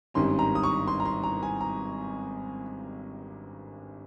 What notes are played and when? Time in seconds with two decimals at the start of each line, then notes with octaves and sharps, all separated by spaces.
0.14 G#1 G2 D#3 G3 C#4 C6
0.39 A#5
0.55 D#6
0.63 C#6
0.88 C6
1.00 A#5
1.05 C6
1.24 A#5
1.43 G#5
1.61 A#5